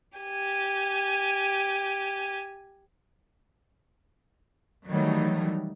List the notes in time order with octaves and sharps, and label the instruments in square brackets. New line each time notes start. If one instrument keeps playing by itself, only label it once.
[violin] G4 G#5
[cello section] D#3 E3 F#3 G3 A3 D#4